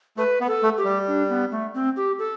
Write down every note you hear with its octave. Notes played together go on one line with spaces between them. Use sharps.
A3 B4
B3
A4
A3
G4
G3
D4
B3
A3
C4
G4
A4